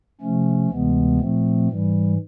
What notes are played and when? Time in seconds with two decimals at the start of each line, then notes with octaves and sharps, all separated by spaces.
0.21 C3 F3 A3 C#4
0.70 D2 C3 E3 G#3 B3
1.19 A#2 F3 A3 C4
1.68 G#2 E3 G3